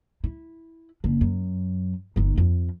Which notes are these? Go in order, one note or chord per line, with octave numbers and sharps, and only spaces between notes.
E4
F#1 D4
F#2
G1 D#4
F2